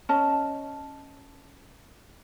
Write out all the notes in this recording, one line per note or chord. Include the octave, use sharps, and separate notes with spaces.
C#4 D#5 A5